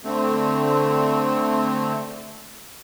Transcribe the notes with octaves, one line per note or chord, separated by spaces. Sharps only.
D3 A3 C4